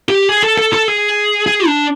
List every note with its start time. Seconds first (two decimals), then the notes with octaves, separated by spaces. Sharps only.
0.09 G4
0.29 G#4
0.43 A4
0.58 A4
0.73 A4
0.88 G#4
1.46 G#4
1.66 D4